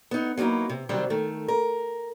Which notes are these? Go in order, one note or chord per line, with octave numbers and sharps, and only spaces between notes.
B3 D#4
F#3 A#3 C4 D#4 E4
C3
C3 D#3 F#3 G3 C4
D#3 A3
A#4